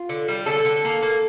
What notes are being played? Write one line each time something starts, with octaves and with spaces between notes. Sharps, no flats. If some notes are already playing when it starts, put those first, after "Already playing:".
Already playing: F4
D3
G3
D3 A4
D3
A#3
A#3